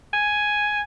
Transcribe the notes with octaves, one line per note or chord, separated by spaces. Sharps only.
G#5